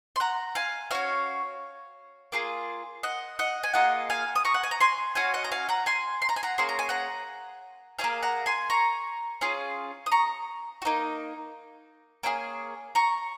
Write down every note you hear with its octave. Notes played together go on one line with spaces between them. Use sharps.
C6
F#5 A#5
F5 G#5
C#4 F#4 C#5 F5
A#3 F4 G#4
D#5 F#5
D#5 F#5
G#5
A#3 F4 G#4 D#5 F#5
F5 G#5
D#6
A#5 C#6
F#5
G#5
A#5
G#5 C6
C#4 F#4 F5 G#5
D#5 F#5
A#5
F5 G#5
F#5 A#5
G#5 C6
C6
A#5
G#5
F#5 A#5
A#3 C#4 G#4 C6
A#5
G#5
F#5 A#5
C#4 G#4 F5 G#5
A#3
F#5 A#5
G#5 C6
A#5 C#6
C#4 F4 G#4
D#6
A#5 C#6
F#4
A#3 D#4
A#3 C#4 F4 G#4
A#5 C#6